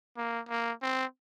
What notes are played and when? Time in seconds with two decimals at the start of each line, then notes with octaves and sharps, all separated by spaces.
0.17 A#3
0.49 A#3
0.82 C4